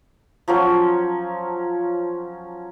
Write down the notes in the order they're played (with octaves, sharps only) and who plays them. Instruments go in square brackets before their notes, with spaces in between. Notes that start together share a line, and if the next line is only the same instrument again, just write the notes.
[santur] F3 F#3 C#4 C#5